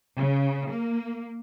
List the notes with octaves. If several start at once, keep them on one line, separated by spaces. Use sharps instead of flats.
C#3
A#3